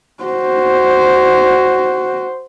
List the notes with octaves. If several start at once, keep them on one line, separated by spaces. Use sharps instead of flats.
F#4 C5